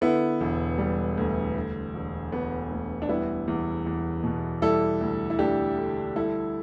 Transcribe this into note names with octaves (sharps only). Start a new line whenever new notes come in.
D3 B3 E4
E1
G3
D2
D3
E1
E1 B3
D2
D4
G3 B3 E4
E2
E2
B2
G3 E4 A4
D2
E4
D2 D4 G4
D3
G3 E4 A4